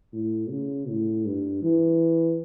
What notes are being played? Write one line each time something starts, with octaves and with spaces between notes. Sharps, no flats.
A2
C#3
A2
G2
E3